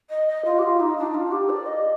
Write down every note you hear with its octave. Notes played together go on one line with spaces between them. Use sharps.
D#5
D#5
F4
G4
F4
D#4
D4
F4
G4
D5
D#5